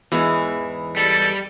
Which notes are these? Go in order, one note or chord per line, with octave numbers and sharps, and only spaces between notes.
E2 G#2 E3 G#3 G#4
G3 A4